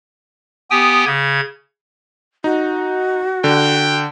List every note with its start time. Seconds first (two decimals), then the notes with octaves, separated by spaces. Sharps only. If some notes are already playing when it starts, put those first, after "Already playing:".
0.71 B3 G4 G5 G#5 D#6
1.06 C#3 G#6
2.44 D#4 F#4
3.44 D3 G5